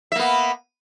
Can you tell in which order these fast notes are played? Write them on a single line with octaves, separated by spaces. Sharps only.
E5 A#3 B3